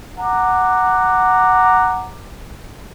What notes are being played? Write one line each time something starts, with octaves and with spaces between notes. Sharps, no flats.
F#5 A#5 D6